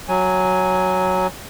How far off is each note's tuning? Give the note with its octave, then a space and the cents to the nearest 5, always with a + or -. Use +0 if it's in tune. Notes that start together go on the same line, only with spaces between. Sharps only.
F#3 +0 G#5 +0